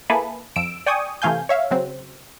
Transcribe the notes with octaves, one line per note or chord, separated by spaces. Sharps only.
A#3 E4 G#4 A4 B4
F2 E6 D7
D5 G5 G#5 C#6 D#6
C3 E3 A3 F5 G#5 G6
C#5 E5 F5
C#3 F#3 C4